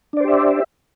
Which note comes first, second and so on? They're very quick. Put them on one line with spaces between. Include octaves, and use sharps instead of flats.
D4 D5 C5 G4 E5